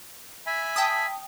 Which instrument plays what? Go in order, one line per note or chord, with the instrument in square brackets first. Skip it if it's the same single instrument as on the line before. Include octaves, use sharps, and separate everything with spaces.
[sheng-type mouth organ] E5 G#5 B5
[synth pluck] G5 A5 D#6